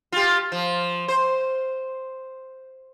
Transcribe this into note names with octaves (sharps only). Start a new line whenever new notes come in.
F4 G4
F3
C5